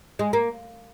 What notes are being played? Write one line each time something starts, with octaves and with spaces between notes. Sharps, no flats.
G#3
A#3